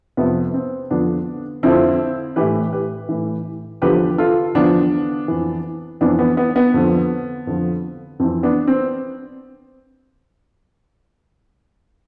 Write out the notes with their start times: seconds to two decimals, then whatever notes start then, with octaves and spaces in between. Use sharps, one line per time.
0.17 F2 C3 F3 B3
0.54 C4
0.91 F2 D3 F3 B3 D4
1.63 F2 D3 F3 C4 E4
2.36 A2 E3 G4 B4
2.72 G4 B4
3.09 A2 E3
3.82 E2 D3 F3 G4 B4
4.18 F4 A4
4.55 E2 D3 F3 B3 D4
5.28 F2 E3
6.01 F2 E3 B3 D4
6.19 B3
6.37 B3
6.56 B3
6.74 F2 D3 F3
7.47 F2 D3 F3
8.20 F2 E3 C4
8.43 B3 D4
8.68 C4